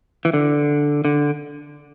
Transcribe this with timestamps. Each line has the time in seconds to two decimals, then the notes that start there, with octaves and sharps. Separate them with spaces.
0.25 E3
0.34 D3
1.05 D3